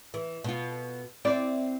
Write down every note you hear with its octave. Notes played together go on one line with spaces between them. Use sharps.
E3
B2 F4
C4 E4 D5